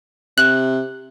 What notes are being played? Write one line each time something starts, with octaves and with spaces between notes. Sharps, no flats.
C3 F#6 F#7